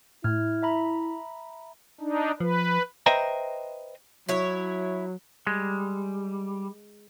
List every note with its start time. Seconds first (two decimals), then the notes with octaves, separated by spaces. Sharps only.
0.24 A2 E4 F6 G#6
0.62 E5 A#5 B5
2.01 D4 D#4
2.40 F3 B4
3.06 B4 C5 D#5 E5 G5 A#5
4.29 F#3 E4 C#5
5.47 G3 G#3